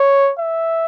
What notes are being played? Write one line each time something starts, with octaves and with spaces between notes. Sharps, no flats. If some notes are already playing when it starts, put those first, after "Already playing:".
Already playing: C#5
E5